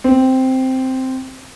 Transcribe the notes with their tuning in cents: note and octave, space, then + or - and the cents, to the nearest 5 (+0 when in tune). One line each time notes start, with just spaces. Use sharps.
C4 -5